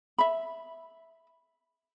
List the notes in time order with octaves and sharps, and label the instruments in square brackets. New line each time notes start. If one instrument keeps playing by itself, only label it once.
[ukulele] E5 B5